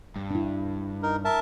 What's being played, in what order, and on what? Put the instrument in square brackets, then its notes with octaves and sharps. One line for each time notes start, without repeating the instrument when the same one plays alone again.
[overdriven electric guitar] G2
[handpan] D4 E4
[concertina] D#4 A#4
A#4 E5 A5